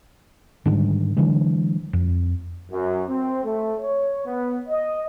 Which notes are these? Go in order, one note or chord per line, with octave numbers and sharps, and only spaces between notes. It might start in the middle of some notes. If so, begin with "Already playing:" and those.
G#2 D3 D#3 G3
D3 E3 F#3 G#3
F2
F#2
C4
A3
C#5
B3
D#5